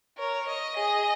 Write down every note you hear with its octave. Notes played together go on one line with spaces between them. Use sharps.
A#4 C#5
D#5
G#4 D#5